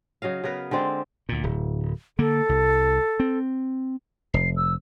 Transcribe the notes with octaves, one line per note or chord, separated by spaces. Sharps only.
C#3 F#3 D#5 F5
C#3 B3 A#4 B4
D3 G#3 C4 D5
D2 A#2
D1
D3 A#3 A4
C2
C4
F1 C7
E6